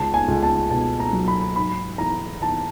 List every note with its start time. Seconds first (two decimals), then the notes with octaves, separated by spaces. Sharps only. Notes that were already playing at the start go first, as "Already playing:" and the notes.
Already playing: C#2 A5
0.14 G#5
0.28 C#2
0.43 A5
0.70 B2 A5
1.00 A#5
1.13 F#3
1.28 B5
1.56 G#2 B5
1.98 E3 A#5
2.41 E3 A5